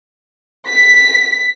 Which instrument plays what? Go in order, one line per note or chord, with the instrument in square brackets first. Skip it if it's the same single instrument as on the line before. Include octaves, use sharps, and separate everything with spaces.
[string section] B6